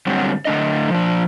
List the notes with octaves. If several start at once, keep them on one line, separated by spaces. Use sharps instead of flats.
G2 D3 F#3 G3 C4 F#4
D3 A3 D4 D#5
F3 D4